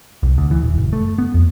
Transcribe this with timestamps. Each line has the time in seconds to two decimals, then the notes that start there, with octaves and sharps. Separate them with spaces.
0.23 C2
0.38 D2
0.51 E3
0.63 D#1
0.78 F#1
0.93 A3
1.18 B3
1.34 F2